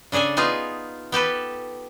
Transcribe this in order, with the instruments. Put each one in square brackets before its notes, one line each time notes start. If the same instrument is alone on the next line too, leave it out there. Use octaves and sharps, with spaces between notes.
[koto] C#3 D4 G#4 A4 G#5
B3 D#4 F4 G#4
B3 G4 A4 B4